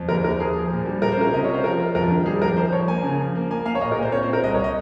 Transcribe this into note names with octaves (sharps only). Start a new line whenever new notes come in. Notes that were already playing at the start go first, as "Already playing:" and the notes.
Already playing: F2
D#2 A#4
D#2 A#4
F3 G#4
F3
A#2
G3
F4 A#4
C5
C#4 A#4
C3 D#5
F4 C#5
C5
F3 A#4
F4
F2 A#4
D#3
G3 G#4
F2 A#4
F3 C5
F3 C#5
A#3 G#5
C#3
F3
A#3
A#3 G#5
A#3 F5
C#5
A#2 D#5
A#4
A#2
C5
C4 C#5
C5
C4
A#4
C2 D#5
C#5
D#5